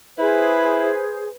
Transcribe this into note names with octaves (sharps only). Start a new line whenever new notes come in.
E4 G#4 B4 C5